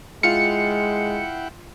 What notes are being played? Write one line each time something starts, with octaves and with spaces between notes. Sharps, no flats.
G#3 E4 F4 F#5 G5 C#7